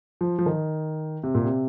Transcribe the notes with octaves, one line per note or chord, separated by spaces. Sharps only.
F3
F3
D#3
C3
A#2
C3